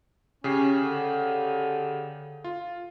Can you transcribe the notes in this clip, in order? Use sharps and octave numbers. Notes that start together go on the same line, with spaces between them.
C#3 C#4 G4 C7
D3
F4